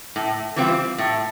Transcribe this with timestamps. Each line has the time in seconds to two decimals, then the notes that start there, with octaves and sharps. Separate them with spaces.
0.16 A2
0.56 E3 G3 C4 F4
0.98 A2